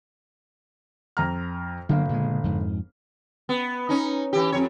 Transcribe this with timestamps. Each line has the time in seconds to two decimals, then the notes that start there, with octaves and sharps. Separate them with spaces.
1.17 F2 A#5 F6
1.89 G1 D3 F#3 A#3 F5
2.09 A#2 C#3 G#3
2.44 F2 G#2
3.49 B3
3.89 C#4 D#4
4.33 E3 G4
4.52 F2 C#5